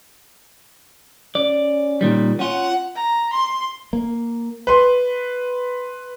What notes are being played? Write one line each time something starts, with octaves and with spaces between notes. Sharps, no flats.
C#4 D5
A#2 D#3 G3
C#4 F4 F#5
A#5
C6
A#3
B4 C6